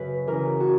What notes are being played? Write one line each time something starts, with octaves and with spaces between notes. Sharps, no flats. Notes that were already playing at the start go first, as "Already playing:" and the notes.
Already playing: F#2 C#3 B4 C#5
C#3 E3 A#4
F#4